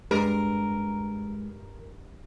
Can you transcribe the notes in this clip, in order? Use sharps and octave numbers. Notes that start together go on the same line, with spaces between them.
G2 G#3 A#4 C6